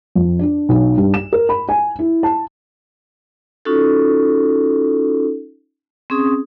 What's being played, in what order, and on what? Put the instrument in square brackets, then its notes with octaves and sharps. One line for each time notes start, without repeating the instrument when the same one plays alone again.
[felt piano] F2
D4
B1
G2
E7
A#4
B5
G#5
E4
A5
[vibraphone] C#4 D#4 F4 F#4 A4
C4 C#4 G#4 D#6